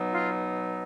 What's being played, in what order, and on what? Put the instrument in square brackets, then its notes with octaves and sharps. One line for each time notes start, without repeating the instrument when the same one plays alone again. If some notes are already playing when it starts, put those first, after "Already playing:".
Already playing: [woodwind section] B2 F#3 B3 D#4
F4